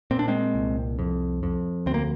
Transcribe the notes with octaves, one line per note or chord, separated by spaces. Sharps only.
A#2 C4
D4
G#3 C4
C2
F2
F2
D2 C4
A#3